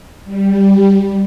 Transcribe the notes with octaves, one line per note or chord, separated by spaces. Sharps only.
G3